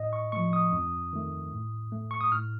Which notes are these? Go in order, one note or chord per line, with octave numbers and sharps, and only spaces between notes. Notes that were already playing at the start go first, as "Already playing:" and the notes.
Already playing: A2 D#5
C#6
F3 A3 C#6
D#6
F2
D#3 A3
A2
A3
C#6
D#6
A2 F6